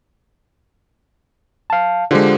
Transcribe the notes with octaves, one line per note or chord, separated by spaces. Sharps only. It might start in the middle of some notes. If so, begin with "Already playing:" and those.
F5 A5
D3 G#3 F4 G4 C5